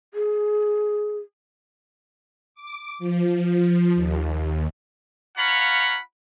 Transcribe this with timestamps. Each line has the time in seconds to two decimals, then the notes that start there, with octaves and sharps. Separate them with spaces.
0.14 G#4
2.54 D6
2.99 F3
3.95 D#2
5.37 F4 C#5 F5 F#5 A#5 B5